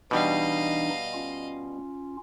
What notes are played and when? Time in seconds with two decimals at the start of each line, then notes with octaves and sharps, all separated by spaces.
0.11 B2 E3 G3 D4 D#4 D#5 F5
1.14 C#4 F4